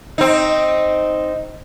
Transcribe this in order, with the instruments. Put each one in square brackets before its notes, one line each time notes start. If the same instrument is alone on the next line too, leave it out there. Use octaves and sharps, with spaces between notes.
[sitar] C4 D#4